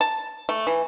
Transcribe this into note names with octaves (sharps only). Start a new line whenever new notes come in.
A5
A3
E3